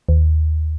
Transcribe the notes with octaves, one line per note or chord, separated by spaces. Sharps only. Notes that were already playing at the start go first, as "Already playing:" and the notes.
D#2